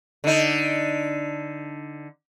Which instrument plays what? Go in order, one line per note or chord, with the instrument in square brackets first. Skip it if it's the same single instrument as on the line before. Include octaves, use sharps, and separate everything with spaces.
[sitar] D3 D#4